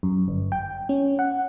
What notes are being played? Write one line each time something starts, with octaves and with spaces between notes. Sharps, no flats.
F#2
G1
G5
C#4
F#5